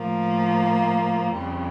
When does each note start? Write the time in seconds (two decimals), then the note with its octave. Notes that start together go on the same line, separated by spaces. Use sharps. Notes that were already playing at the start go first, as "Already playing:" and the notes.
Already playing: A2 F3 A#3
1.34 F2 C#3 G3